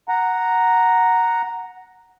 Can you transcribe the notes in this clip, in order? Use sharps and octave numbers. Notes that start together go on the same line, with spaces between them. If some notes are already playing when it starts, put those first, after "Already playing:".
F#5 A#5